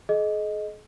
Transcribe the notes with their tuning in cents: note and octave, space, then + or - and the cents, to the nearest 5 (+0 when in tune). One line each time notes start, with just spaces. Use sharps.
G#4 +40 D#5 +0